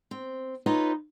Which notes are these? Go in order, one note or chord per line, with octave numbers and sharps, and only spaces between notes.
C4
D#4 F4 A4 B4 C#5 D#5